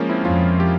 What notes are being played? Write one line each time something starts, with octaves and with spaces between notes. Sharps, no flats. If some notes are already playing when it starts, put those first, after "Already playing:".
Already playing: F3 G#3 A#3 C#4
C4 E4
F2 C#4 F4
G4